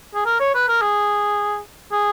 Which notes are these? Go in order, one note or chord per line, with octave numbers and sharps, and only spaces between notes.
G#4
A#4
C#5
B4
A#4
G#4
G#4